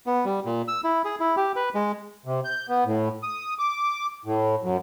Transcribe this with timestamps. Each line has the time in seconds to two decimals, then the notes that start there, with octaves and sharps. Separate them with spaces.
0.06 B3
0.25 G3
0.45 A#2
0.68 E6
0.84 E4
1.05 G#4
1.20 E4
1.37 G4
1.56 B4
1.75 G#3
2.26 C3
2.45 G6
2.69 B3
2.86 A2
3.23 D#6
3.59 D6
4.26 A2
4.62 F#2